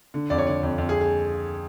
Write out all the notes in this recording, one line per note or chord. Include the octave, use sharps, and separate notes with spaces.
D3
F2 D5
C#5
D3 D5
F2
F2
G#4
G#4